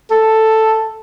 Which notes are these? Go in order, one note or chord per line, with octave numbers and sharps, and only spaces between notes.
A4